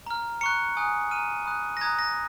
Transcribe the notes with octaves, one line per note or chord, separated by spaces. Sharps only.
A#5 F6
A#5 C#6 F#6 C#7
G#5 D#6 F#6
A#5 F6 D#7
B5 D#6 F#6
A#6
A#5 D#6 F#6 G#6
A#6